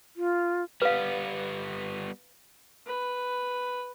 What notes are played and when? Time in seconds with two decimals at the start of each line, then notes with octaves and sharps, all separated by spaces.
0.16 F4
0.82 G3 B3 B4 F5
2.87 B4